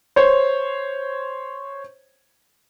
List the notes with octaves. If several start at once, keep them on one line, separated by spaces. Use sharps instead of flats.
C5 C#5